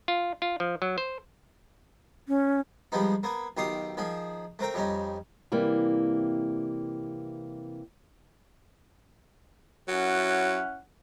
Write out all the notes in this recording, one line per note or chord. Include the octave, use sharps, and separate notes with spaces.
F4
F4
F3
F#3
C5
C#4
F3 G3 G#3 B3 D#4
A#3 B3 G#5
B1 D#3 F4 G4 C6 D#6
D#3 F3 G#4
A3 C4 A#4 G5
F2 G3 C#4 D#4
C3 E3 G3 A#3
F#3 C#4 E4 F#5